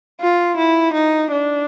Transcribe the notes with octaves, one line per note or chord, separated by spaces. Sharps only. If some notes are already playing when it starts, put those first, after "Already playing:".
F4
E4
D#4
D4